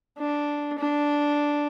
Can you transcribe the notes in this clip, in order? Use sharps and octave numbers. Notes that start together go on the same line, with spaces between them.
D4
D4